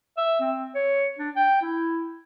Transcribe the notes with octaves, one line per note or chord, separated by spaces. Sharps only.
E5
C4
C#5
D4
G5
E4